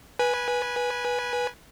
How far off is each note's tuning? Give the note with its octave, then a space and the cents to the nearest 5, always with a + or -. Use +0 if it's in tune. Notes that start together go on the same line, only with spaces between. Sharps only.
B4 -15 G#5 +0